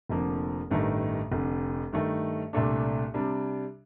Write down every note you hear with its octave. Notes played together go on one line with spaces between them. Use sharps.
F1 F2 D3 F3 A#3
A1 G2 D#3 A3
F1 F2 D3
G2 D#3 A3
C2 A#2 A3 D4
C3 G3 D4